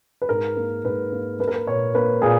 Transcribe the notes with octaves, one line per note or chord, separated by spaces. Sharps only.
B4
G#2 A#4
A#3
G#2 B4
A#3
A#3 B4
A#4
B4
A#2 C#5
A#3 B4
A#2 G#4